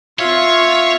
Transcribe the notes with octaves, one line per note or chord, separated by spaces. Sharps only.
C4 F4 C#5 E5 F5 C#6